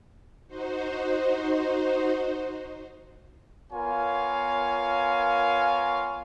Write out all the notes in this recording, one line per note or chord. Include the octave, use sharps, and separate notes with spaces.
D#4 F#4 C5
B3 F4 A#4 C#5 F5 G#5